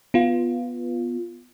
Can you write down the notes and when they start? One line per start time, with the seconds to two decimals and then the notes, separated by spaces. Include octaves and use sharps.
0.14 B3 F4